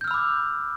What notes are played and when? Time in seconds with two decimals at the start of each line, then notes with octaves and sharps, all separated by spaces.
0.01 G6
0.04 F6
0.08 E6
0.11 B5
0.14 D6